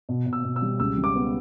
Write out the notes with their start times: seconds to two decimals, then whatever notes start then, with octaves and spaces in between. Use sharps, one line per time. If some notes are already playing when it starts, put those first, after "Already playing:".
0.09 B2
0.26 B2
0.33 E6
0.44 B2
0.56 E6
0.62 G3
0.80 C#2 E6
0.98 G3
1.04 D6
1.16 B3